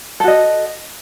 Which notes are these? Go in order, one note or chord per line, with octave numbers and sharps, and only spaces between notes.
F#4 A4 D#5